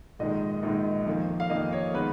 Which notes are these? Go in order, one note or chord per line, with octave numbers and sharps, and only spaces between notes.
A#1 G#2 D#3 G#3 D#5
A#1 G#2 D#3 G#3
F2 D#3 A#3
F5
F2 D#3 A#3 D#5
C#5
D#3 G#3 B3 B4